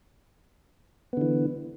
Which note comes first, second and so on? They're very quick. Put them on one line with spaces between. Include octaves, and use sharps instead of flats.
B3 D3 E3